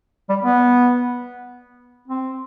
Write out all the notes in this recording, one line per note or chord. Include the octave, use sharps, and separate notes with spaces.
G3
B3
C4